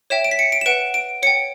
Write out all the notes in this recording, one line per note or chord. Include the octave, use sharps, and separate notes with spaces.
C#5 E5 G5 E7
D7
B6
C#7
D7
E7
B4 F#5 D7
D7
C#5 G5 C#7